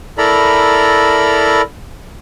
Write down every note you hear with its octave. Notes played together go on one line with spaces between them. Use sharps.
E4 A4 A#4 D5 A#5 B5